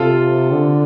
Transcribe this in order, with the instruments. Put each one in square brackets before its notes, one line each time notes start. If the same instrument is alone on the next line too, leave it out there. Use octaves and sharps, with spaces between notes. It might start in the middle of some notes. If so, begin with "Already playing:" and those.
Already playing: [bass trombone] C3 [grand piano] F4 A4
[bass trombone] D3